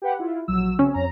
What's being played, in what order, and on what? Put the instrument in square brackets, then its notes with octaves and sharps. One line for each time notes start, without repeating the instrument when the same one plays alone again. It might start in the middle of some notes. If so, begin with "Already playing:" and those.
[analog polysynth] G4 B4 F#5
E4 F4
A#1 F#3 E6
[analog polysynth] C#3 C4 [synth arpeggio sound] C#4
[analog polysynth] F2 A#5